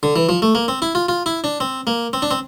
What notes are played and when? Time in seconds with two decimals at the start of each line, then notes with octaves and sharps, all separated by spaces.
0.03 D3
0.16 E3
0.29 F3
0.42 A3
0.55 A#3
0.68 C4
0.82 E4
0.95 F4
1.09 F4
1.26 E4
1.44 D4
1.60 C4
1.87 A#3
2.13 C4
2.22 D4
2.31 C4